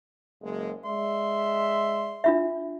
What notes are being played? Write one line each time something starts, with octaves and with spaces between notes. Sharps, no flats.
F#1 G#3
G#3 D5 E5 C6
D4 F4 E5